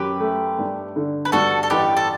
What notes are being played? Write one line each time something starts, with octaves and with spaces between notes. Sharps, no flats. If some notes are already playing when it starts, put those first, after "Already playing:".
Already playing: F#2 C#4 G4 B4
A3
G2
D3
B4
G2 F#4 A4
A4
A1 G4 B4
A4